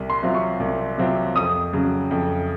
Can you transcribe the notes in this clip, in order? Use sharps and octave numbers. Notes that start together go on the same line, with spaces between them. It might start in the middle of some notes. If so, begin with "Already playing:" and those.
Already playing: C2
C6
C3 F#3 C4 F4
C#6
C2
C3 F#3 C4 F4
F2 D#6
C#3 F#3
F2